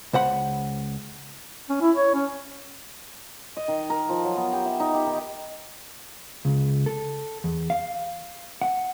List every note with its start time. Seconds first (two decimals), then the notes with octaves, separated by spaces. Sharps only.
0.13 C#2 C5 F#5 B5
1.69 C#4
1.81 E4
1.96 C#5
2.14 C#4
3.57 D#5
3.68 D#3
3.90 A#4
4.09 F3
4.24 F#3
4.37 B3
4.53 G4
4.65 E5
4.80 D#4
4.94 G4
5.06 D#3
6.45 C#2
6.86 A4
7.44 E2
7.70 F5
8.61 F#5